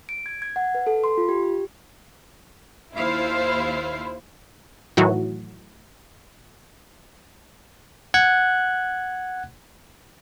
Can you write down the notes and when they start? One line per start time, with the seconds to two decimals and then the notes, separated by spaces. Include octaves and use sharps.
0.09 D7
0.26 G#6
0.42 G#6
0.56 F#5
0.75 B4
0.87 A4
1.04 C6
1.17 F4
1.29 G4
1.43 G4
2.95 D#2 E4 F4 C5 F5
4.97 A2 D#3 E3 F#3 F#4
8.14 F#5 F#6 G#6